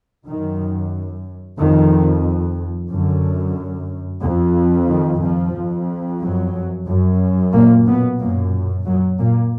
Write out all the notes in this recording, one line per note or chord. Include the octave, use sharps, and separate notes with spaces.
F#2 D#3
F2 D#3
F#2 D3
F2
D#3
F2 F3
F2
F#2 F#3
F#2
A#2 A#3
B2 B3
F#2 A#2 A#3
F#2 F#3
A#2 A#3